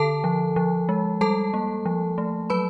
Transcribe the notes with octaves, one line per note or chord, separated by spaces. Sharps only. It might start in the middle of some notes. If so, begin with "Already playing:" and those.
Already playing: D3 A4 A5
F3
F3
G#3
G3 A4 A5
A#3
F3
A3
F#3 B4 B5